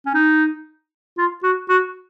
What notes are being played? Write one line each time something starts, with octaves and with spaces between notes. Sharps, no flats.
C#4
D#4
F4
F#4
F#4